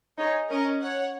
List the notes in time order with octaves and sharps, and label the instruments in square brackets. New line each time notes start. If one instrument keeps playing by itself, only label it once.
[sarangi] D#4 [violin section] G#4 C#5
[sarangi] C#4 [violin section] A#4 D#5
[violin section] C#5 F#5